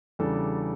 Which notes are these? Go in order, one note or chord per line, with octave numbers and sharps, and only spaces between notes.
E2 C#3 G3 D4 A4